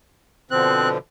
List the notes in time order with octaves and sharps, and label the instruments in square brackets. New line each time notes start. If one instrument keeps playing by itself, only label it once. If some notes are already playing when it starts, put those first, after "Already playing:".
[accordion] B2 D3 F3 [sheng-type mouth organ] C4 F#6